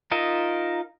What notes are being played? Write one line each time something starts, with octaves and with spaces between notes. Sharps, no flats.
D#4 F4 A#4 D#5 E5